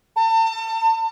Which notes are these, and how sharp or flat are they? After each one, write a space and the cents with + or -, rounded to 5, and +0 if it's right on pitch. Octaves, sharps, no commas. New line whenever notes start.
A5 +35